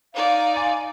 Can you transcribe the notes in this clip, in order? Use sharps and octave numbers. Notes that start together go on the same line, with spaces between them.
D#4 D5 F5
G#5 C6 A6